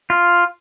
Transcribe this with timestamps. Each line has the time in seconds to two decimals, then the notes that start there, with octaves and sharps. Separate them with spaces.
0.10 F4